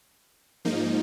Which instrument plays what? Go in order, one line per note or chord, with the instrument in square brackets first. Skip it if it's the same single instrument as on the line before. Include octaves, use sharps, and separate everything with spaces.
[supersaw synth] G#2 F3 A#3 D#4